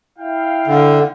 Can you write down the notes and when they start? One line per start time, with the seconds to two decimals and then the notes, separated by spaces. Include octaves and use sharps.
0.19 E4 F5 G5
0.67 D3